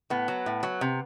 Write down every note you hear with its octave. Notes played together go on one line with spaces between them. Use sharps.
A2 B3
F#3
A2
F#3
C3